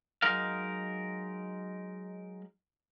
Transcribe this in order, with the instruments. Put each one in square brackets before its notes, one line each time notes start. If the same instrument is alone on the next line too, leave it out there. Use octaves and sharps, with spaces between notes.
[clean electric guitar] F#3 G#3 D#4 A#4 F5